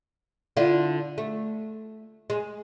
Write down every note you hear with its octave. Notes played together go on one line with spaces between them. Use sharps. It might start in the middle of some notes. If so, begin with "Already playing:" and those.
D3 E4 F4
A3
G#3